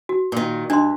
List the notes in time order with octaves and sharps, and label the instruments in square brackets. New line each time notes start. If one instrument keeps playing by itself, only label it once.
[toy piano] F#4
[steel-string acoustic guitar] A#2 D#3
[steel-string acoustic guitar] G2 [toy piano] D4 D#5 C6